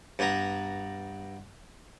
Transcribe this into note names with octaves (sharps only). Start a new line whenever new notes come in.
G2 B3 A#5